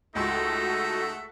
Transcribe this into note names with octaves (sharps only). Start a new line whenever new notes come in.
C#2 A3 D#4 F#4 A4 E5 C6